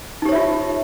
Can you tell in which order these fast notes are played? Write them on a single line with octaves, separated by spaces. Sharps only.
D#4 G4 C#5 E5 F4